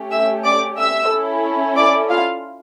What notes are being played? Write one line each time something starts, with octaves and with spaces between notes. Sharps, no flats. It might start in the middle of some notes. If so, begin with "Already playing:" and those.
Already playing: A3 C#4 G4
E5 E6
D5 D6
E5 E6
C#4 E4 A4
D5 D6
F4 F5